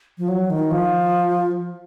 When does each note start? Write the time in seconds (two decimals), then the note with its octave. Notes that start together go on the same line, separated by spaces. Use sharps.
0.18 F3
0.28 F#3
0.50 D#3
0.71 F3